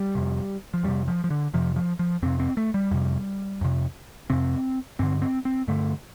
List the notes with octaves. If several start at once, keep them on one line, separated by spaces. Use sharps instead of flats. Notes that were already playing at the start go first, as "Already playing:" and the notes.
Already playing: G3
F2 C3
F3
F2 C3 G3
F3
F3
D3
F2 C3 F3
F3
F3
F2 C3 C4
C4
A3
G3
F2 C3
F2 C3
F2 C3 C4
G2 D3 C4
C4
C4
G2 D3 A3